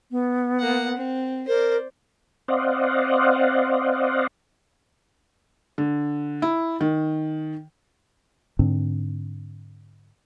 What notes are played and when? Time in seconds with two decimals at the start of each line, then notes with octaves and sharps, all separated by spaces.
0.11 B3
0.60 A#3 F#5
0.97 C4
1.48 A#4 C5 D5
2.48 C4 C5 D5 D#5 F5 F#5
5.78 D3
6.42 E4
6.81 D#3
8.59 G#2 D3 C4 D4